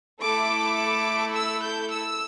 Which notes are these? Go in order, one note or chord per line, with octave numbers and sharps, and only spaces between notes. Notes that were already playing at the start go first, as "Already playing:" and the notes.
A3 E4 A4 D6
E6
G6
E6